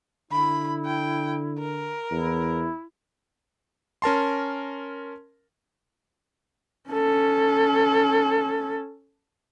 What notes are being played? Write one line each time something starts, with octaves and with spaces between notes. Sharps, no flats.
D3 E4 B5
G5
A#4
E2 E4
C#4 A#4 A5 C6
C#4 A4